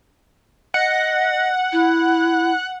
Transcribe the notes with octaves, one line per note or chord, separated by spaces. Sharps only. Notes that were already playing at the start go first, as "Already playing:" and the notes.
D#5 F#5
E4